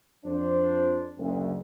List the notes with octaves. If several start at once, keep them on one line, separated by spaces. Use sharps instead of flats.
F2 D4 C5
F#1 D2